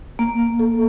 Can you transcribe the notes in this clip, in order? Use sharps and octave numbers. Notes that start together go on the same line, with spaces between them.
A#3
A4